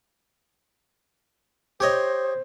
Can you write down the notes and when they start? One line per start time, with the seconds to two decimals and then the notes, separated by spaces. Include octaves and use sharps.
1.80 G4 C5 C#5 D#5